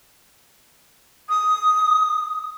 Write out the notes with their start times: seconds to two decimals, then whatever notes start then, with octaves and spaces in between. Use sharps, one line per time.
1.29 D#6